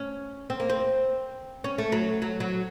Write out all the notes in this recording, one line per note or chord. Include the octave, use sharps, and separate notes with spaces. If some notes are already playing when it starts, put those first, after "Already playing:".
Already playing: C#4
C4
A#3
C4
C#4
A3
F#3
F#3
F#3